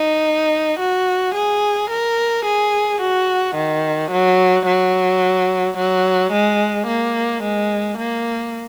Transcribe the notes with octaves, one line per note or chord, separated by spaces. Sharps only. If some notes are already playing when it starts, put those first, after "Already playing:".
Already playing: D#4
F#4
G#4
A#4
G#4
F#4
D#3
F#3
F#3
F#3
G#3
A#3
G#3
A#3